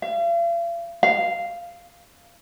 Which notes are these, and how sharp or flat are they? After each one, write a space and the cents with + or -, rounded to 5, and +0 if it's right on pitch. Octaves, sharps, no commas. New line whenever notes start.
F5 -45
F5 -10